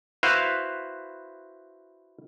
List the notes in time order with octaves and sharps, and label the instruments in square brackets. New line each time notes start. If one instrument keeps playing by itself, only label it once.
[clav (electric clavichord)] E4 F#4 B4 C5 F5